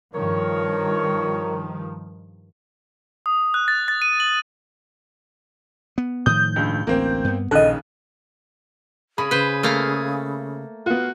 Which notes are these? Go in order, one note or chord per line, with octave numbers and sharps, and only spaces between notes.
G2 D#3 F3 A#4 C#5
D#6
F#6
A6
A6
D#7
F#7
B3
A2 D#3 F3 D#6 G6
C#2 G2
A1 D2 A#3 C4
G2 B3
A#1 D#2 C#3 A4 D#5 F#6
C#3 G#4 B5
C#3 B4 C5
A3 A#3 F5
B3 F4 F#4